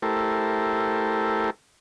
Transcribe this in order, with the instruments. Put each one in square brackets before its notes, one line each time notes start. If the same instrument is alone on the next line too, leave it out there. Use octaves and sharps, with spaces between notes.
[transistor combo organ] A3 E4 G4 A4 A#4 C5